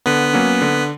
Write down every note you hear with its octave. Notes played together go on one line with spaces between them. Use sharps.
D3 B3 B4
F#3 A#3 C#4
D3